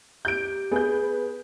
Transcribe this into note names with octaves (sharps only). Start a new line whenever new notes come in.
G4 G6 D7
B3 G#4 G6
B4